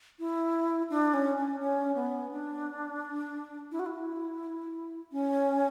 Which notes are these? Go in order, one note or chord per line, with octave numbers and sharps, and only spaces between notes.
E4
D4
C#4
C#4
C#4
B3
D4
E4
F#4
E4
C#4